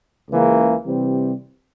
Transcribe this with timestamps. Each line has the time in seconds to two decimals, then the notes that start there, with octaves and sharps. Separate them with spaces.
0.29 C#2 C#3 E3 A#3
0.86 C3 E3 G3 C4